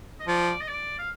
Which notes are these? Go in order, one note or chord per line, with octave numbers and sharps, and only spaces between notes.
D#5
F3 D5
D#5
D5
F5